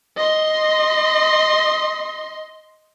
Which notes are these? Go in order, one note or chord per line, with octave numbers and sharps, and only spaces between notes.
D#5 C6